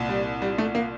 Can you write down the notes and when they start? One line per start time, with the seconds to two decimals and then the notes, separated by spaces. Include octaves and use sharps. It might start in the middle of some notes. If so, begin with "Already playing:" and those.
Already playing: C2 A#2
0.09 G3
0.42 G3
0.58 A3
0.75 A#3